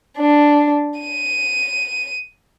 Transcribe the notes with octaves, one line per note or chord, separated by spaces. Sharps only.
D4
D#7